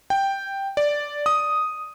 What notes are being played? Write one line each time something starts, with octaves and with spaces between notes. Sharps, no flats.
G5
D5
D#6